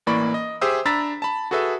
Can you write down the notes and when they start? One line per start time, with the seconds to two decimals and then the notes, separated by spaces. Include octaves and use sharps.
0.06 A1 E3 A#3 D5 B5 C#6
0.34 D#5
0.61 G4 G#4 C5 E5 D#6 E6
0.85 D4 A#5 B5 E6 A6 B6
1.22 A5 B5
1.51 F#4 G#4 A4 B4 E5